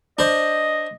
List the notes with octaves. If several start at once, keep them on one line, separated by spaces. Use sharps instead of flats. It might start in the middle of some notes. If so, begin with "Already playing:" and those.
D4 C5 D#5